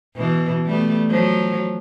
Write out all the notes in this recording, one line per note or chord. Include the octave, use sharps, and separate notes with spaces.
B2 E3
G3 A3 B3
F3 F#3